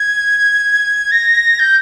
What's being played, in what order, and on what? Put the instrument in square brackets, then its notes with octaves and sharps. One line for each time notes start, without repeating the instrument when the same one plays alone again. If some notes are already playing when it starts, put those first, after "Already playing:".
Already playing: [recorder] G#6
A#6
G6